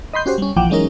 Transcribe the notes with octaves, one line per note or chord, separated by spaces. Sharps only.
D#5 B5 C6 G6
C#4 F#4 G4 C5
G3 C#4
A#1 E3 F3 F#5 G5 D6
E3 F#3 G#3 C#4 D#4 A#4